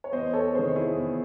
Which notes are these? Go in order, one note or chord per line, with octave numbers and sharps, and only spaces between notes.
C#5
E2 C5 D#5
A4 C#5
C3 D#3 G#4 C5
E4 G#4
E2